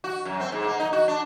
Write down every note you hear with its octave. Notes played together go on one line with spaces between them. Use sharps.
F#4
F#2
C4
G#2
A#3
D#4
F#4
D4